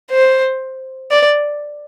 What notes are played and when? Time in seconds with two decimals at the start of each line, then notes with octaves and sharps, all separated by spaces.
0.11 C5
1.11 D5